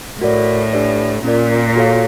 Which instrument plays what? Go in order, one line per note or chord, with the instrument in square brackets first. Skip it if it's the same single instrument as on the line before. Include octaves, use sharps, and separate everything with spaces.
[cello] A2 [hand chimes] F#4 A#4 D5
[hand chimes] D4 G4 B4 D5
[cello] A#2 [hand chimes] C#4 F4 A#4 D5
[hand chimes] F#4 A4 C#5 F5